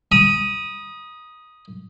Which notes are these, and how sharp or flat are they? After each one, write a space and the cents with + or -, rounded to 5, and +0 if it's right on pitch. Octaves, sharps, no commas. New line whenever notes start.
B5 -45 D#6 +0